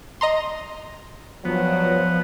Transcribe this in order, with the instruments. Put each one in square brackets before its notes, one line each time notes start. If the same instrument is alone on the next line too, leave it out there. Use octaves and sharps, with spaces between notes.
[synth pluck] D#5 A#5 C6
[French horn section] G2 F#3 [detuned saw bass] F3 [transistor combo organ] B3